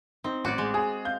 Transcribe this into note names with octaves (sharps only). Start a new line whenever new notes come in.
C4 D#4
A1 F#4 D5
G#3
G#4
F5 G6